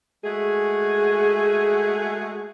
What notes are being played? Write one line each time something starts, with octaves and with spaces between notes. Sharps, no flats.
G#3 A3 F#4 G#4